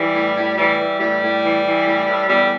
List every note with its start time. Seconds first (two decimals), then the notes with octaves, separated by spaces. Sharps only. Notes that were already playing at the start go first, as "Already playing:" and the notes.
Already playing: E3 G3
0.14 A2
0.36 A2
0.57 E3 G3
0.79 E3
1.00 A2 G3
1.22 A2
1.43 E3
1.64 E3
1.86 A2
2.07 A2
2.29 E2 G3